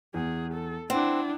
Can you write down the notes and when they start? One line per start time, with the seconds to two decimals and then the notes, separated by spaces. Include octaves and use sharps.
0.14 E2 G#4
0.54 A4
0.90 C4 D4 E4 F#5 F#6